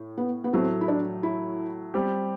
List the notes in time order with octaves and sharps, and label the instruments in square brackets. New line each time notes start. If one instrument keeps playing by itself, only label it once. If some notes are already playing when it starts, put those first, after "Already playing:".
Already playing: [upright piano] A2
[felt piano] B3
B3
[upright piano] A2 F#3 A3 [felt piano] C4
[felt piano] E4
D4
E4
[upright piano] G3 C4 G4